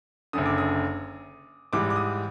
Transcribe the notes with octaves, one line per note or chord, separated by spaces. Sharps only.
F#1 F#2 D3 D#6
D6
D#6
G#2 E3 G3 D6
D6
D#6